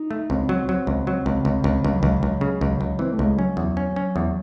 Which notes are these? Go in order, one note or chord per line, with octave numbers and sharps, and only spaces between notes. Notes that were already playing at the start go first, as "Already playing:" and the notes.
Already playing: D#4
A3
C#2 C4
F#3
F#3
C#2
F#3
C#2
C#2
C#2
C#2 G#3
F#3
C#2 E3
F#3
C#2
C#3
C#2
C#2
E3 C4
A3
C#2
G#3
F#3 C#4
E2
C#4
C#4
E2